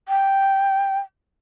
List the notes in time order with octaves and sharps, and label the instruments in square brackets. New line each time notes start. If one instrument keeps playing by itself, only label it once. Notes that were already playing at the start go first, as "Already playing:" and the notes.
[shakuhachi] G5